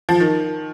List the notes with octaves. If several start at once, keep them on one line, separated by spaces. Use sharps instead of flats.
F3
D#3